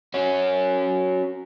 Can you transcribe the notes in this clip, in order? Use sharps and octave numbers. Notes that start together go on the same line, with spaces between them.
C#4 F#4